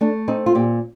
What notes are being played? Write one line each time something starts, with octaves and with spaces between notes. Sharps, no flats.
A3 D4
C4 D#4
F4
A#2 G4